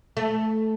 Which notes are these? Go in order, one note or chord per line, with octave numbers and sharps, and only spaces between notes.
A3